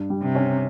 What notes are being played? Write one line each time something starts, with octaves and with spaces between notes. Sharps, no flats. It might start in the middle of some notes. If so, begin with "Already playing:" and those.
Already playing: G2
G3
C3
C#4